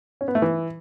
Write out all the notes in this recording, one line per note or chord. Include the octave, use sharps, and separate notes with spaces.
C#4
B3
A3
E3